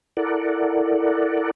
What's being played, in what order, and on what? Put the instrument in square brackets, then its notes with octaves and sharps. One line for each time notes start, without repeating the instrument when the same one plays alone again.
[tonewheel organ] E4 A4 A#4 D5 F#5